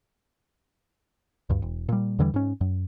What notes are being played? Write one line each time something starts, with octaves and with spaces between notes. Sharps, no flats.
D2 G2
E1
A#2 G3
E2 D3 E3 G3
G#2 C#4
F#2